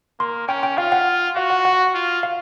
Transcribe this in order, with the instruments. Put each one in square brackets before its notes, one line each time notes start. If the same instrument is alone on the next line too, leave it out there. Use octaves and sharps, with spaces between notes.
[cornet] A#3 [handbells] C6
[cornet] C#4 [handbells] G5
[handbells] G5
[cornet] F4 [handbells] F5
[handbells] F#5
[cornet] F#4 [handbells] F5
[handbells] F#5
F#5
[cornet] F4
[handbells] F5